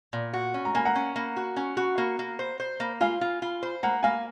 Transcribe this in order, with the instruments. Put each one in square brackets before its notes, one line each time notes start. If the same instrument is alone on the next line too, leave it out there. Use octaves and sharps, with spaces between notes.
[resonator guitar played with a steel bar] A#2
F#4
C#4
[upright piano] A#5
[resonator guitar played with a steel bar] A#3 [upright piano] G#5
[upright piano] F#5 A#5
[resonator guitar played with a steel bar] C#4
A#3
F#4
C#4
F#4
A#3
A#3
C5
C5
A#3
[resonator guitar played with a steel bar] F4 [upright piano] F5 G#5
[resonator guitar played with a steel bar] F4
F4
C5
[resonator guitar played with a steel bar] A#3 [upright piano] F#5 A#5
[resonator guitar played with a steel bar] A#3 [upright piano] F5 G#5